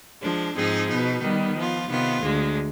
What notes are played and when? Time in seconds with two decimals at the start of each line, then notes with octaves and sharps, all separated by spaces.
0.21 F3 G#3 D4
0.55 G#2 F3 C4 D#4 G#4
0.88 B2 B3 D#4
1.22 D#3 G3 B3
1.56 F3 B3 F4
1.89 C3 D#3 B3 F4
2.23 D2 D3 G#3